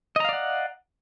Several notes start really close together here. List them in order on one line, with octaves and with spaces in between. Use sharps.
D#5 A#5 F5 D5 F#5